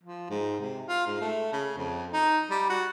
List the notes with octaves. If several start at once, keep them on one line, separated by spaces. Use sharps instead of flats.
F3
G#2
C3
F4
G#2
A3
C#3
F2
D#4
G3
F#4